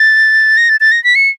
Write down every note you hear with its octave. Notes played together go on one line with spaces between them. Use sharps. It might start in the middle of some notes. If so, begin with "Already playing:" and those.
Already playing: A6
A#6
A6
A6
A#6
B6
C#7